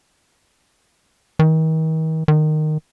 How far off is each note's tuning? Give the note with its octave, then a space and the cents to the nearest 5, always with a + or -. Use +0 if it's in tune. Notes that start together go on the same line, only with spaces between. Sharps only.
D#3 +40
D#3 -15